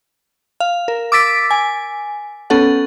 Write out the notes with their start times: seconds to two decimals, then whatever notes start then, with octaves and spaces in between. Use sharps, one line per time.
0.60 F5
0.88 A#4
1.12 D6 E6 A6 B6 D7
1.51 G#5
2.50 B3 C#4 A4 F#5